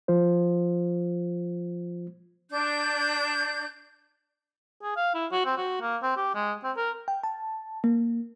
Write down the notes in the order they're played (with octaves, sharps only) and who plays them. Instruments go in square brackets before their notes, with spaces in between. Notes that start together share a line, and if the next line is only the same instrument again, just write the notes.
[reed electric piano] F3 F4 C5
[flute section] D4 G6
[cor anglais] G#4
F5
E4
F#4
C4
F#4
A#3
C4
G4
G#3
C4
A#4
[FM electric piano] G5
A5
A#3